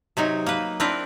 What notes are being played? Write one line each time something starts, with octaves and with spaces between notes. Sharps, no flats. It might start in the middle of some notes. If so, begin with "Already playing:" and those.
C3 F#3 D#4 G#5
A#3 B4
C4 D4 E4 A#4 B4